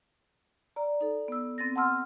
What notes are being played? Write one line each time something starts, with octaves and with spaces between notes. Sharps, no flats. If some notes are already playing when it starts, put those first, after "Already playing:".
D5 A#5
D#4 A4
B3 E6
C4 A6 A#6
F#5 A5 C6 E6 F6